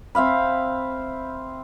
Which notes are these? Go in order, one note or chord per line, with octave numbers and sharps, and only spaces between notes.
C4 E5 F5 B5